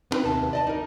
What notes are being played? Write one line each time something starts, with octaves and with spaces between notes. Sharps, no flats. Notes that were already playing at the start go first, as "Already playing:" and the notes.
B3 C4 D#4 A#4 B4
D#2 C3 A5
D5 D#5 A5
D#4 A#4